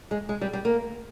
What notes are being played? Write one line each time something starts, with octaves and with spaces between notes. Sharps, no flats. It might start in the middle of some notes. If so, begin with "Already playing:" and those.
G#3
G#3
G3
G3
A#3